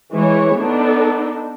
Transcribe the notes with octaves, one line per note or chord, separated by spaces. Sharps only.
E3 G#3 C#5
B3 D4 D#4 A4